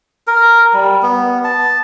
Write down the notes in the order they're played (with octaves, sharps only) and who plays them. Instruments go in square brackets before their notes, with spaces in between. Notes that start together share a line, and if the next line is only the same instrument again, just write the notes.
[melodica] A#4
G3
B3
A5